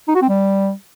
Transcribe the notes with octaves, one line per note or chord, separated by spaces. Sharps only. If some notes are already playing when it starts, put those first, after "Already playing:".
D#4
F#4
C4
G3